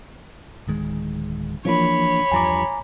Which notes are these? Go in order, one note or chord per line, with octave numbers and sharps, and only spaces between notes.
D1 D#3 G#3
E3 F3 A#3 C4 D4 C#5 B5
E2 G2 F3 G#5 A#5 D6